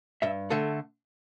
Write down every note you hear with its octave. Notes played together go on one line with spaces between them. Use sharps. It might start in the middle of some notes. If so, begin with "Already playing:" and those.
G2 E5
D3 A3 A4